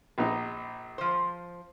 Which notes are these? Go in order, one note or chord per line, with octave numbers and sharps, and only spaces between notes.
A#1 D#4
F3 C5